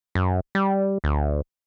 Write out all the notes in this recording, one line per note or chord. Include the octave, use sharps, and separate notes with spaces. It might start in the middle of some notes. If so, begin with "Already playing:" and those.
F#2
G3
D2